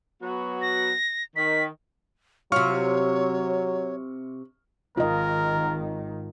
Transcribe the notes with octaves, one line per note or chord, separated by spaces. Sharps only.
F#3 B3 F#4
A#6
D#3 B6
C3 F#3 F4 C#5 C#6 F6
G#1 D#3 F4 A#4 D#5